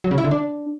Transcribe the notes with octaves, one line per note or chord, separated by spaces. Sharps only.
F#3
C#3
E4
D3
D4